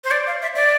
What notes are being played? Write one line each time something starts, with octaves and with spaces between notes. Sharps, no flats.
C5
D5
F5
E5
D5